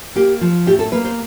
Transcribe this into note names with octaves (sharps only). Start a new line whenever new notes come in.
A#3 G4
F3
A2 G4
A4
A#3 B4
C5